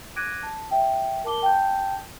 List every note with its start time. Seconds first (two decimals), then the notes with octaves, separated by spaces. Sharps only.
0.16 D6 F#6 G#6 A#6 D7 D#7
0.43 A5
0.71 E5 G5
1.24 A#4 A5 D6 G7
1.42 G5 A5 G6